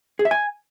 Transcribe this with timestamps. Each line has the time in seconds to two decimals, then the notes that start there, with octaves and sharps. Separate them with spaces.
0.19 G#4
0.25 E5
0.31 G#5